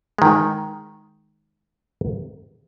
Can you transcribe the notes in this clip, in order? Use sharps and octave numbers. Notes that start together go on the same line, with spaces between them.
D#3 G#3